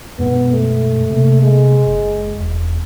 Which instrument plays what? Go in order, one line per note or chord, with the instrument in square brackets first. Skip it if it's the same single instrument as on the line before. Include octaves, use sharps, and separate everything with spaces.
[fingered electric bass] F#2 B2 G#3 [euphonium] B3
[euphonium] A3
[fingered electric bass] C3 A#3
[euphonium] G#3
[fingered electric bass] F#1
E1